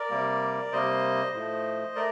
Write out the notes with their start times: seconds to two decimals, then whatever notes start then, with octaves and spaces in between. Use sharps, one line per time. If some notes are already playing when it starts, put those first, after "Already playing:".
Already playing: A#4 D5
0.10 C3 G3 A#3
0.72 C3 G3 A#3 C5 D#5
1.33 A2 F3 A3
1.95 A3 A#4 D5